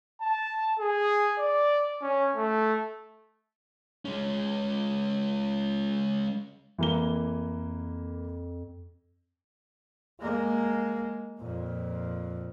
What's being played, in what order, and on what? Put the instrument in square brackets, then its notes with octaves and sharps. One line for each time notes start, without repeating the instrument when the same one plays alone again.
[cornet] A5
G#4
D5
C#4
A3
[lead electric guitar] G#3 C#4
[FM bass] F2 [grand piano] E3 A#3 G7
[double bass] G#3 A#3
F2 A#2